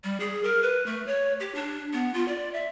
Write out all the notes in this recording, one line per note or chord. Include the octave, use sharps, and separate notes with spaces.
G3
G#4
A#4
B4
A3
C#5
G4
D4
B3
F4
D5
E5